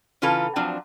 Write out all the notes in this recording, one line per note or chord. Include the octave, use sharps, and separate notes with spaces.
C#3 E3 F4 A4 B4 A#5
F3 F#3 C4 D4